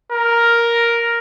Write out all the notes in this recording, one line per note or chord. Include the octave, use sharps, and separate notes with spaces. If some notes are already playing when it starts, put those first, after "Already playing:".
A#4